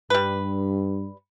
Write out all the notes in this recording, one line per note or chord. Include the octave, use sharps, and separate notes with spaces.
G2 G3 B4